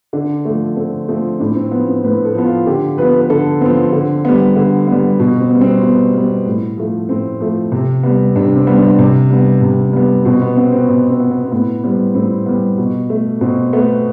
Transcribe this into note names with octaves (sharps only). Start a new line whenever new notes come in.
D3 D4
F3 A3
D3 C4
F3 A3 C4
A2 D4
C4
F3 B3
C4
A2 B4
A4
F3 B3
F4
D3 G4
F3 B3 B4
B4
D3 A4
F3 B3 C4
D3
G3 B3
D3
G3 B3
B2
C4
G3 B3
C4
B2 B3
G3 B3
A2
F3 A3
A2 C4
F3 A3
C3
G3 B3
C3 D4
C4
G3 B3
D4
C3
G3 B3
C3
G3 B3
B2 C4
B3
B3 C4
C4
B2 B3
C4
B3
B3
C4
A2 B3
G3 B3 C4
A2 C4
G3 B3
B2
A3
B2 C4
A3 B3